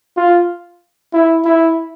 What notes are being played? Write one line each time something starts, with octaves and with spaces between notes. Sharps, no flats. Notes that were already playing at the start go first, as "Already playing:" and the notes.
F4
E4
E4